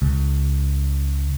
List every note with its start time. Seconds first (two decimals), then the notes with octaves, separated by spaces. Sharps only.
0.02 C#2